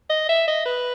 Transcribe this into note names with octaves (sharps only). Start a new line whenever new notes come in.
D#5
E5
D#5
B4